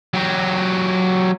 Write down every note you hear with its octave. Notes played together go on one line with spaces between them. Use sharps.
F#3 G4